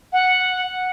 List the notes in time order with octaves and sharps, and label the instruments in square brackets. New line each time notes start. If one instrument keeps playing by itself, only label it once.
[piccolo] F#5